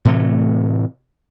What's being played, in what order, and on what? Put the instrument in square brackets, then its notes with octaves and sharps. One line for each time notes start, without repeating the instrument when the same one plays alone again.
[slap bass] A2 C3 E3 A3